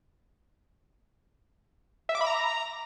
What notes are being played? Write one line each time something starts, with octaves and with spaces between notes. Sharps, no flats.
E5
D6
B5
A#5